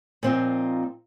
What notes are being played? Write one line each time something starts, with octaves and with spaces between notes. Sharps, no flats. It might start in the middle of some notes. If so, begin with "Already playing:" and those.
A#2 F3 C4 D#4